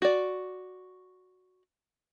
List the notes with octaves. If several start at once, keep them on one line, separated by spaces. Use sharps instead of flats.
F#4 D5